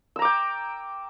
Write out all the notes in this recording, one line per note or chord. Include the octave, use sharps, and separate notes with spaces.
G5 A#5 D6 E6